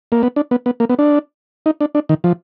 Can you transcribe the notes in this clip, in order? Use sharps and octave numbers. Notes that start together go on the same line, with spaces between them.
A#3
B3
D4
B3
B3
A#3
B3
D4
D#4
D4
D4
D#3
F3